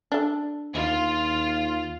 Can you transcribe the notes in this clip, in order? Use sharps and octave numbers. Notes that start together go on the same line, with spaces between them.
D4 A4
D#2 F4